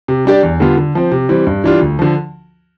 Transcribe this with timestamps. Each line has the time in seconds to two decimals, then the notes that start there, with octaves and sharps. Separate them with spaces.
0.08 C3
0.25 G3 D4 G4 D5
0.43 E2
0.60 D3 G3 B3 F4
0.77 D3
0.95 F3 C4
1.12 C3
1.29 E3 G3 C4
1.47 G2
1.64 E3 G3 D4 F4
1.81 D2
1.99 D3 F3